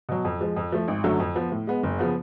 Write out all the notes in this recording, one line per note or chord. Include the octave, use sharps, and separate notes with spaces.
B2 F#3
F2
F3 G#3
F2
F3 A3
G#1
F#2 D3 F#3 A3
F2
F3 B3
A2
G#3 B3
F#1
C#3 F3 B3